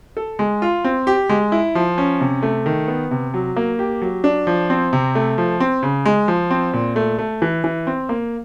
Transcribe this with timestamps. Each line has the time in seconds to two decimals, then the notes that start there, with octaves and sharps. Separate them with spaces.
0.17 A4
0.39 G#3
0.62 F4
0.84 C4
1.07 G4
1.29 G#3
1.52 E4
1.75 F3
1.98 C#4
2.21 C3
2.43 A3
2.66 D#3
2.88 B3
3.11 C3
3.34 F#3
3.57 A#3
3.79 G4
4.02 F#3
4.24 D4
4.47 F3
4.70 C4
4.93 C3
5.15 A3
5.38 F3
5.60 C4
5.83 C#3
6.06 G#3
6.28 F3
6.51 C4
6.73 A#2
6.96 A3
7.19 A3
7.42 E3
7.64 E3
7.87 C4
8.09 A#3